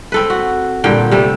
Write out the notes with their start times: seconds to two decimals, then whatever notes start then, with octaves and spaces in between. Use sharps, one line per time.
0.12 C4 A4 B4
0.30 F#4
0.84 G2 A#2 D3 G5
1.12 C3 G3 A3